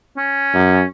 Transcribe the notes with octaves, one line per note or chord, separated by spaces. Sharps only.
C#4
F#2